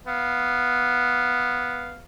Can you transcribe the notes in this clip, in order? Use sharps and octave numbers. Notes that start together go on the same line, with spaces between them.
B3 F5